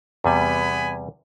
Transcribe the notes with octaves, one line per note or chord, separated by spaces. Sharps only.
E2 C3 G3 B3 G#5 B5